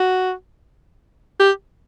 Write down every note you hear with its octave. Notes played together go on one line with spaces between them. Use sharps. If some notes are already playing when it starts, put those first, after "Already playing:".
Already playing: F#4
G4